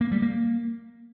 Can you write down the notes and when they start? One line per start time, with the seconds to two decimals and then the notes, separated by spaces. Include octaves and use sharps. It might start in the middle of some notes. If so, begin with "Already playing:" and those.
0.01 A#3
0.12 G3
0.22 A#3